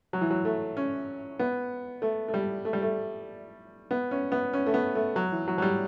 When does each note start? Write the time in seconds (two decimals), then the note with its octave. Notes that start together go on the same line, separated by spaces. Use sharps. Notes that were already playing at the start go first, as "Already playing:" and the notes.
0.13 F#3
0.21 E3
0.30 F#3
0.45 A3
0.77 C#4
1.39 B3
2.02 A3
2.28 A3
2.34 G3
2.65 A3
2.73 G3
2.82 A3
3.91 B3
4.11 C#4
4.32 B3
4.53 C#4
4.66 A3
4.74 B3
4.95 A3
5.16 F#3
5.32 E3
5.48 F#3
5.58 F#3
5.62 G3